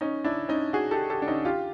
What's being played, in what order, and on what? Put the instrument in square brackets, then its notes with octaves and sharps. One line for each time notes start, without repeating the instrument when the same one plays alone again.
[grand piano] C#4 D#4
D4 E4
C#4 D#4
F#4 G#4
G4 A4
G4 A4
D4
C#4 D#4
F4 G4